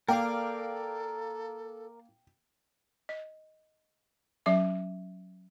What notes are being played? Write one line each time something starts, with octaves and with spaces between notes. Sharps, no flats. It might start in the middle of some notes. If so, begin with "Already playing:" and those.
A#3 A4 A#4 D5 F5 G5
D#5
F#3 C#4 E5 D6